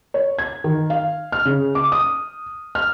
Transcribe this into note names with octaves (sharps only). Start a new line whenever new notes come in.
C#5
G#6
D#3
F5
F6
C#3
D6
D#6
F6